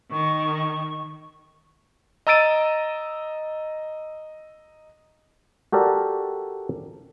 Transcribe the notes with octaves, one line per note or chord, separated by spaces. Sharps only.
D#3 C#6
D#5 A#5 E6 A6 D7 D#7
F#4 G4 A4 A#4 D5